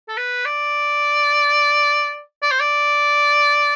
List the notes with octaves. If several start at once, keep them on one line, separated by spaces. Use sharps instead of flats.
A4
B4
D5
D5
C5
D5